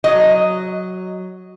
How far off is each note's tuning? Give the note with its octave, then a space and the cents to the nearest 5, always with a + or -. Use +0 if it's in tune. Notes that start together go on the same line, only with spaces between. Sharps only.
F#3 +0 D#5 +5